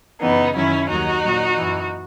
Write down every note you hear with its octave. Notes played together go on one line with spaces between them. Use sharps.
F#2 C#3 E3 B3 D#4
F#2 D#3 F#3 C#4 E4
D#2 D#3 F#3 D#4 F#4
A#2 F#3
F#2 E3